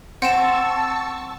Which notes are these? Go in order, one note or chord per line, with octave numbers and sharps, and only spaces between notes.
C4 F#5 G5 A5 C#6 E6 E7